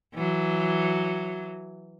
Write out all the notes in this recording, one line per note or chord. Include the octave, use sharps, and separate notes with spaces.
E3 F#3